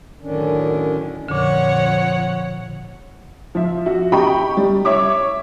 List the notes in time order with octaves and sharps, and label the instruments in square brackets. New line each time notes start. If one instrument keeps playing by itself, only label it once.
[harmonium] F#2 A2 D3 D#3 C#4 D4
[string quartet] F2 C#5 F#5 [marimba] A#2 D3
[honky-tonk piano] F3 E5
F#4 E5
G4 D#5 G5 A#5 B5 C#6
G3
C#5 E5 C#6 D6